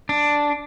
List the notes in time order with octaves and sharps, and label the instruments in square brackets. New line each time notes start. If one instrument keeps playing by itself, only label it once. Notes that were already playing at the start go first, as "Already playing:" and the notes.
[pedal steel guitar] D4